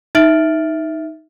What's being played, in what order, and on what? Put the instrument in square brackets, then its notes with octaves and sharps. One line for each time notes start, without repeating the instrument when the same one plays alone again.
[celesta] D#4 E5 F6 A6 D7 F#7